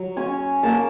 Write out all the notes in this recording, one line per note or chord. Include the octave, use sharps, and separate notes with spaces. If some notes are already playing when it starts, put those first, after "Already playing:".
Already playing: F#3
C#4 G#5
A#3 A5